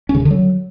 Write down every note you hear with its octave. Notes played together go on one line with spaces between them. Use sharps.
C#4
C#3
C3
D3
F#3